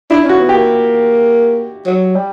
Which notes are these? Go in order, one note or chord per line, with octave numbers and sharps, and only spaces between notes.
D4 E4
C#4 F#4
B3
A#3 G4
F#3
G3